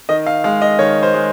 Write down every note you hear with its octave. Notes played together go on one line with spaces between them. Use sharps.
D#3 D#5
F5
G#3 F5
D#5
D#3 C#5
C5
G#3